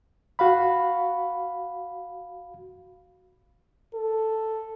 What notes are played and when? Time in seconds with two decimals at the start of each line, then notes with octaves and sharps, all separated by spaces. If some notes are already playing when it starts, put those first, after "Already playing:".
0.39 F#4 F5 B5
3.95 A4